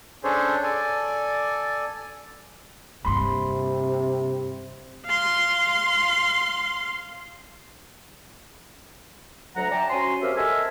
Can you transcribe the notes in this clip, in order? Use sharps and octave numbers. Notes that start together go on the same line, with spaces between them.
C#4 D4 G#4 A4 C5 C#5
A4 D5 G#5
G2 C3 A#3 B5 C6
F5 C6
D2 F#3 F#5 A#5
D5 E5 G5 A5 A#5
C#4 F#4 C5 G#5 C6
C4 G4 A#4 C5 E5 F5
A4 A#4 C5 D#5 E5 G#5